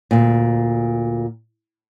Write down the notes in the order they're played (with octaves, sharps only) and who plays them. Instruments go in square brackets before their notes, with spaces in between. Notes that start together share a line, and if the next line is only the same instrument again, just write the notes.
[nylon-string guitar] D2 A#2